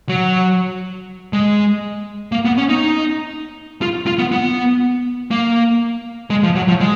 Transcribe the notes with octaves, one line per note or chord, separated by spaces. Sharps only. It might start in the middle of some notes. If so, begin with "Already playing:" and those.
F#3
G#3
A#3
B3
C#4
D#4
F4
F4
B3
B3
A#3
G#3
F3
F#3
F3
G#3